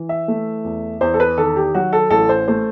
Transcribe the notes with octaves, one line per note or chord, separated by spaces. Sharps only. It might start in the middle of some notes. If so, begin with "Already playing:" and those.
Already playing: E3
E5
A3
E2
E2 C5
A4
B4
D#3 A4
G4
F#3 F#4
A4
A1 A4
C5
A3 C5